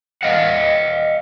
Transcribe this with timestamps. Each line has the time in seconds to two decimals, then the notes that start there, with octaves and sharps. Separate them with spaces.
0.23 D#5 F5 F#5